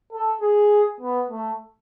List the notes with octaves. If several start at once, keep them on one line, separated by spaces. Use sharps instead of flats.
A4
G#4
B3
A3